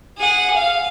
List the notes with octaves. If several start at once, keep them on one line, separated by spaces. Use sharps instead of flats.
G#4 F#5
F5